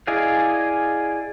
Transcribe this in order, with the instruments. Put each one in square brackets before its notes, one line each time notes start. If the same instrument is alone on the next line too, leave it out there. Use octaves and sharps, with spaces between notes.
[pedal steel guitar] E4 G#4 D5 D#5 F5